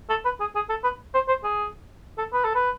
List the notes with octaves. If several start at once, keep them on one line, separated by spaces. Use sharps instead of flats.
A4
B4
G#4
G#4
A4
B4
C5
C5
G#4
A4
B4
A4
B4